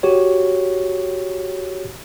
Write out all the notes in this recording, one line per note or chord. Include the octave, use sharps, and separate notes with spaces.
F#4 G4 C#5